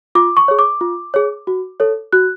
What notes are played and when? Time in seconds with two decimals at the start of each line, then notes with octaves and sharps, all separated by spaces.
0.15 F4 D6
0.37 C#6
0.48 G#4 C#5
0.59 D6
0.81 F4
1.14 G#4 C#5
1.47 F#4
1.80 A4 C#5
2.12 F#4 F#6